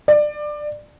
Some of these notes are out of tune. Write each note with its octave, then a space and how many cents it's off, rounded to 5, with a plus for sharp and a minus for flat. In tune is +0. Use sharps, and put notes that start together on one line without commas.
D5 +20